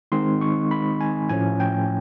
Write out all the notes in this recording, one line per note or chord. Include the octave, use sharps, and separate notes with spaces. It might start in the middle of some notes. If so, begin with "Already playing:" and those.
D#3 G#3 C4 D#4 C6
C#6
B5
G#5
A2 F3 A3 C#4 G#5
G5